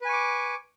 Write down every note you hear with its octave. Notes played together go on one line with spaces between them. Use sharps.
B4 G#5 C#6 D6